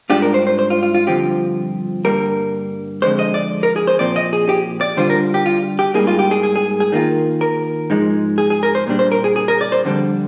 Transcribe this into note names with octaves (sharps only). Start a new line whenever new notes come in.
G#2 G3 D4 F4 G4
A#4
C5
C5
C5
F4
F4
F4
G2 D3 F3 C4 F4 G4
G2 D3 G3 A#3 A#4
F2 D3 G#3 C5
D#5
D5
A#4
G#4
C5
A#2 F3 C4 D5
D#5
G#4
G4
D5
D3 G3 D4 F4 C5
A#4
G4
F4
G4
G#2 G3 A#3 D#4 G#4
F4
G4
G#4
G#4
G#4
G#4
D#3 A#3 F4
A#4
G#2 F3 G#3 D#4
G#4
G#4
A#4
C5
A#2 G3 D4
C5
A#4
G#4
G#4
A#4
D5
C5
F2 D3 G3 D4